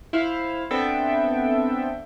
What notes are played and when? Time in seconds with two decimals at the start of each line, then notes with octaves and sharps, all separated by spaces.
0.13 E4 C5 F5
0.71 B3 C4 D4 A4 E5 G5